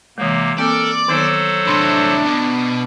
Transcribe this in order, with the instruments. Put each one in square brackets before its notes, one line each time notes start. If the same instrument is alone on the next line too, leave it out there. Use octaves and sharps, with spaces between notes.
[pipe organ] C3 A#3 [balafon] E3 G#3
[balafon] A#3 C4 [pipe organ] A4 A#4 [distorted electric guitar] D5
[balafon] D#3 B3 D#4 [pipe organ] F#3 A4 C5
[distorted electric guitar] A2 C3 [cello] D4 [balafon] B5 C6
[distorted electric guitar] B2